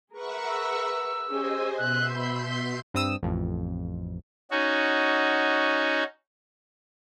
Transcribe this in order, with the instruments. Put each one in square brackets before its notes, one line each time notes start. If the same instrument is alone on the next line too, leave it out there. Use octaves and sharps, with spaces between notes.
[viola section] G#4 A#4 B4 [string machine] E5 F#5 C#6
[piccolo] E6
[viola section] C#4 G4 G#4 [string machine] C5 D#5 G#5
[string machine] B2 C6 G6 [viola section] E5 [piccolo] F#6
[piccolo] B5
B6
[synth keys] G2 C4 D#6 E6
A1 F2
[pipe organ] C#4 D#4 F#4